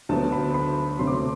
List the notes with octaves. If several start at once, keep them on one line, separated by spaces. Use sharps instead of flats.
D2 D3 F#3 B3 A5
B5
B5
D2 C3 F#3 A3 C6
D6
C6